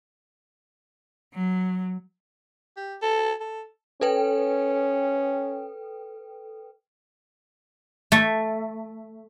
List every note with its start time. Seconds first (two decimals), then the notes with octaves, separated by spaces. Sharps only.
1.34 F#3
2.77 G4
3.02 A4
3.40 A4
4.01 C#4 A4 B4 G5
8.12 A3